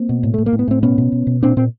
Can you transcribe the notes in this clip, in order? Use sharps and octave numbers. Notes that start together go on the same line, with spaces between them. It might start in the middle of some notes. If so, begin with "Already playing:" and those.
Already playing: A#3 C4
B2
A2
A2 A3
A#3
A2
B3
A2 C4
B2 B3 C#4
B2
B2
B2
A#2 C4 D4
A#2 C4